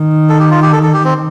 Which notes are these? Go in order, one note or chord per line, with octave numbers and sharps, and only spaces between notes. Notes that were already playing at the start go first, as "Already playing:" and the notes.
Already playing: D#3
A4
G4
F4
G4
A4
A4
G4
C4